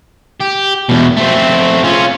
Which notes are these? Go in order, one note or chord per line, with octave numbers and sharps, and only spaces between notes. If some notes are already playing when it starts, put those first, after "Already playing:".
G4
E2 B2
A3 C4
C#4 F4